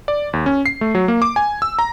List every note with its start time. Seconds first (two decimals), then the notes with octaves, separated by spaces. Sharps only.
0.08 D5
0.33 D#2
0.46 C#4
0.66 C7
0.81 A3
0.95 F#3
1.08 A#3
1.22 D6
1.36 G#5
1.62 E6
1.79 A#5